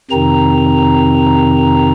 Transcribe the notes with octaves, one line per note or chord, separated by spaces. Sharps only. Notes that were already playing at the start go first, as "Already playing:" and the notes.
F2 C3 D#3 C4 D#4 A#5